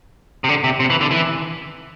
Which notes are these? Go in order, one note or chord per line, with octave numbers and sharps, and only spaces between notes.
C3
D3
C3
C3
E3
D3
E3